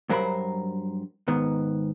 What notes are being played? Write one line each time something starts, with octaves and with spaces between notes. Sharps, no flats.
G2 F#3 A#4 C5 B5
G#2 D#3 B3